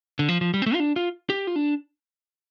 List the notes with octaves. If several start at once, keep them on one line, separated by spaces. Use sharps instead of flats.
D3
F3
F3
G3
C4
A3
F4
D4
F4
G4
F4
D4